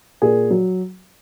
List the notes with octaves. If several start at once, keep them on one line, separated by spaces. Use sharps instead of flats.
A#2 G#4
F#3